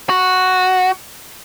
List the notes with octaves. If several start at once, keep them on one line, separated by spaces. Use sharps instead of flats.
F#4